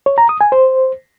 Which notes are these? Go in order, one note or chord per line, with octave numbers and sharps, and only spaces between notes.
C#5
A#5
D#6
G#5
C5